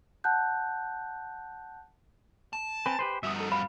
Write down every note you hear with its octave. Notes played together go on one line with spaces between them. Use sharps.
F#5 A5 F#6 G6
A5
C4 B4 G#5
G4 B4 C5
G2 F#4 E5 F5 D#6
D#4 A4
F5 B5